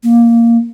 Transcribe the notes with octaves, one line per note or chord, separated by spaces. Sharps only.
A#3